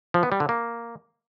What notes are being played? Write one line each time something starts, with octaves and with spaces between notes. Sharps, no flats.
F3
B3
G3
D3
A#3